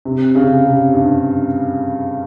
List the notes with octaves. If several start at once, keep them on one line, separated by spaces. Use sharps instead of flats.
C3
C#3
C3
G2